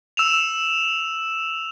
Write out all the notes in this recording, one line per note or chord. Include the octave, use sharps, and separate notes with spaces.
E6 E7 F7